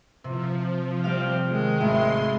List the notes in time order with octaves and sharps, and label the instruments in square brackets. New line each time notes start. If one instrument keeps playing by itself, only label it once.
[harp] C3 [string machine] F3
[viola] G3 C4 [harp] F5
[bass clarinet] D#3 [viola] G#3
[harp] G#1 [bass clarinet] A3 [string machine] C6